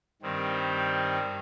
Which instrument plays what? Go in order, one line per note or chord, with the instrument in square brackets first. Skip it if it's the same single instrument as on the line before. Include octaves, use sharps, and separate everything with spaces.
[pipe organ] G2 D#3 G3 C4